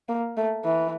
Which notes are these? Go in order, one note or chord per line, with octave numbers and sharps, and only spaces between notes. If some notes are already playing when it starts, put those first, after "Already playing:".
A#3
A3
E3